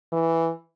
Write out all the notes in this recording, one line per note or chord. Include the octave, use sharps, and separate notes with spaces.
E3